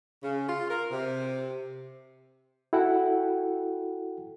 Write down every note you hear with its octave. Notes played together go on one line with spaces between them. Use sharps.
C#3
F4
A#4
C3
E4 F#4 A4 F#5 G5